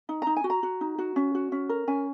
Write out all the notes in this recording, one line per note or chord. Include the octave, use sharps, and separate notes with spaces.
D#4
D#4 A#5
G#5
F#4
A#5
F#4
D#4
F#4
C#4
F#4
C#4
A#4
C#4 G#5